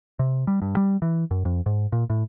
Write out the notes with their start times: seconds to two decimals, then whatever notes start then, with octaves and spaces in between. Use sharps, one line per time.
0.19 C3
0.47 G3
0.62 G2
0.77 G3
1.02 E3
1.31 F#2
1.45 F2
1.66 G#2
1.92 A#2
2.10 A2